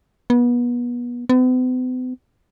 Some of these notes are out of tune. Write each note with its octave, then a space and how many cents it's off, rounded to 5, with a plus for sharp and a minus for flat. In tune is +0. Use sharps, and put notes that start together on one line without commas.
B3 -30
B3 +45